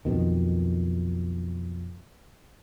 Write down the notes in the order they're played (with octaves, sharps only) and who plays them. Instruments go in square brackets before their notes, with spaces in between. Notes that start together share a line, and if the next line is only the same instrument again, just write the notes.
[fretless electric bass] B1 F2 B2 D#3